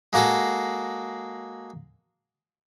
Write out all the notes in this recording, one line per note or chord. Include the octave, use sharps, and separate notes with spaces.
G#3 A#3 F#4 G#4 A4